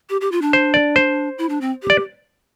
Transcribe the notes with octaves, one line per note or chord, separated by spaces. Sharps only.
G4
G4
F4
D4
C5
D5
C5
E4
D4
C4
G4
D5